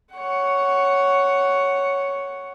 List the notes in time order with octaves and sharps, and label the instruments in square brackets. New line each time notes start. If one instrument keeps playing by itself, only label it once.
[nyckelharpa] C#5 F#5